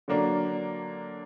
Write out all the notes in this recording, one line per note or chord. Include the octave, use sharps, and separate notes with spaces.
D3 F#3 A#3 D4